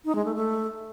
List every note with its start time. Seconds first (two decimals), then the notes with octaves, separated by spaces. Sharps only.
0.05 D#4
0.15 G#3
0.25 A3
0.35 A3